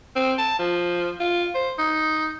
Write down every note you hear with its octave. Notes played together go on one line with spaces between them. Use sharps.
C4
A5
F3
F4
C5
D#4